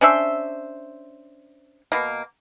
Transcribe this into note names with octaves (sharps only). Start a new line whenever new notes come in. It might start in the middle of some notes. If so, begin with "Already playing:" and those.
C#4 D4 C5 E5
B2 A#3